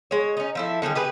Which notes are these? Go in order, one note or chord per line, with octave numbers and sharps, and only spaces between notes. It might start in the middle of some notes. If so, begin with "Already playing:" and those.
G#3 C#5
C#4 D#4
F3 E4 A4
D3 D#3 G3 G#4
G4 G#4 B4